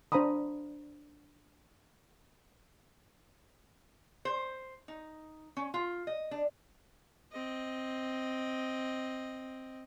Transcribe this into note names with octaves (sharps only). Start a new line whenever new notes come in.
D4 C5 F5 A#5 B5 D#6
C5
D#4
C#4
F4
D#5
D4
C4 D#5